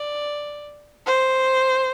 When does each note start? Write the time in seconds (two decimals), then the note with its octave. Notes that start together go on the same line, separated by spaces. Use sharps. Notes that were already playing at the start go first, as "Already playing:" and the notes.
Already playing: D5
1.06 C5